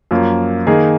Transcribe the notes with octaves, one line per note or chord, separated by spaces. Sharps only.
F#2 F3 A#3
D#3 A#3 D#4 G#4